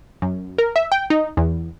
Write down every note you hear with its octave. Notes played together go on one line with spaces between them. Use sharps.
F#2
A#4
E5
G5
D#4
E2